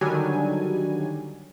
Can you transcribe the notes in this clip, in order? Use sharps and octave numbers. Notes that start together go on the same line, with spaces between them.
D3 D#3 F#3 G3 D4 G#5